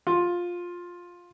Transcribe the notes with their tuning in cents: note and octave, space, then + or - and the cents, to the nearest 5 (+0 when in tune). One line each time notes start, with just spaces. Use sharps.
F4 +10